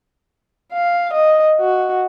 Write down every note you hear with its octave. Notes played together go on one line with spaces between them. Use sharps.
F5
D#5
F#4